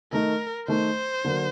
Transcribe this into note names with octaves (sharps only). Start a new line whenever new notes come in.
D#3 A3 D#4 A#4
D#3 A3 D#4 C5
D3 F#3 A#3